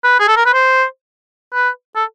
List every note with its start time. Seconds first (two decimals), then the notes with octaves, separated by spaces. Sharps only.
0.04 B4
0.20 G#4
0.28 A4
0.36 A#4
0.45 B4
0.54 C5
1.54 B4
1.96 A4